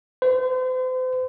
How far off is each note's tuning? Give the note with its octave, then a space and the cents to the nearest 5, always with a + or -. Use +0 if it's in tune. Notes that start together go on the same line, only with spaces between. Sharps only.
C5 -40